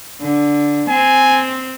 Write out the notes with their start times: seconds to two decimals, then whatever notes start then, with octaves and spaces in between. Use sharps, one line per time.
0.21 D3
0.89 C4 G#5